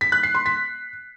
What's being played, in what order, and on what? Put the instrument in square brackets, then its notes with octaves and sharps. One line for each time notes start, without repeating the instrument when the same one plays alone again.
[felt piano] B6
F#6
C7
C6
B6